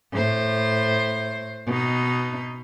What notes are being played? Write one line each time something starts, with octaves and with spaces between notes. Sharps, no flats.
A2 C5
B2 D#4